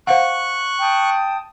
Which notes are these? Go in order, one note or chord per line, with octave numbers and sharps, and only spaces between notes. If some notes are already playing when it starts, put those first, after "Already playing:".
C5 F5 F#5 C#6 F#6
G5 A5 D#6